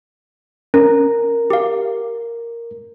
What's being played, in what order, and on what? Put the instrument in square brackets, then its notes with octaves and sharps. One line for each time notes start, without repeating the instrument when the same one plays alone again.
[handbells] C#4 [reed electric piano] A#4
[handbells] G4 F5